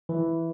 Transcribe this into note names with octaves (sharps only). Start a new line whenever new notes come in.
E3